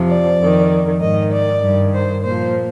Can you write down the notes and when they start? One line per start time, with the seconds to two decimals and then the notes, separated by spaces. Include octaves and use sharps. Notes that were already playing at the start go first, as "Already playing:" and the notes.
Already playing: F2 C3 F3
0.08 D5
0.39 F2 D#3
1.00 G#2 D#3 D#5
1.31 D5
1.62 G2 D#3
1.93 C5
2.23 A#2 F3 C5